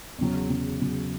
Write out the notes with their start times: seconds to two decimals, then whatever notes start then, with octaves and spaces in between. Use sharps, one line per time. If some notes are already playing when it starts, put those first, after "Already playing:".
0.18 E2 C#3 F#3
0.50 E2 C#3 F#3
0.81 E2 C#3 F#3